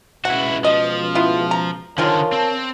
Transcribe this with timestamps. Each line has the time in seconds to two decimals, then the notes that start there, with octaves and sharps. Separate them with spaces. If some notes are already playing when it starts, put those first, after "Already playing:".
0.25 C#2 B2 E4 F#4 F#5
0.64 F3 D#5
1.15 B3 E4 F4
1.51 A#5
1.98 D3 D#3 F3 G#3 F4 A#4 C#5 A5
2.32 C4